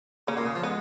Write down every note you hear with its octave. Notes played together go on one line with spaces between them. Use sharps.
C#3 A#3 C#4
A#2
C#3
F3
G#3 B3